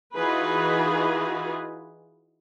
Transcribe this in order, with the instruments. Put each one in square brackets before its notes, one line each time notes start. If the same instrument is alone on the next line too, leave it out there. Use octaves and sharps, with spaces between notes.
[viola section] E3 D#4 F4 F#4 G#4 B4